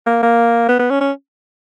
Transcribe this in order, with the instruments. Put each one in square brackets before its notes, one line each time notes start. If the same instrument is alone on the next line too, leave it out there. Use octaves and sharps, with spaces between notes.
[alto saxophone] A#3
A#3
B3
B3
C#4
C#4